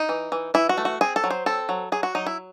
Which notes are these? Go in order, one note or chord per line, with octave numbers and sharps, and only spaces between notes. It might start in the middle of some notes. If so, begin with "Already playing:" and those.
Already playing: D#4
E3
E3
E3 E4
F#4
A3
F#4
C4 G#4
A4
F#3
C5
C4 A4
F#3
F#3 G#4
F#4
F#3 D#4
E4